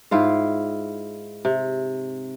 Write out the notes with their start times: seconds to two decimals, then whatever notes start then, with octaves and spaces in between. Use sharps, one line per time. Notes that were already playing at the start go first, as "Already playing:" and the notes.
0.11 G#2 E4 F4 F5
1.45 C3